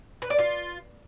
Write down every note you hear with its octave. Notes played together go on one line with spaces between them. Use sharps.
B4
D5
F4